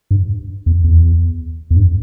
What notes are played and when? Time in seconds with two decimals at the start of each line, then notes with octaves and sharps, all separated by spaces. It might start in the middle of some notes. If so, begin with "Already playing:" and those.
0.11 G2
0.66 E2
0.84 E2
1.71 E2
1.77 G2